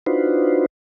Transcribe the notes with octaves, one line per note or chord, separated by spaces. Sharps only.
D4 D#4 F4 F#4 B4 C5